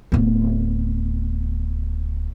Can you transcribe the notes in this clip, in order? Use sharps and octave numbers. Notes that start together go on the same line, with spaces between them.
D1 B3